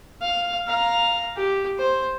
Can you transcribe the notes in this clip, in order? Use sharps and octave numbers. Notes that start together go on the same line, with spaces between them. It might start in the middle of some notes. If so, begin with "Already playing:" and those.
F5
F5 A#5
G4
C5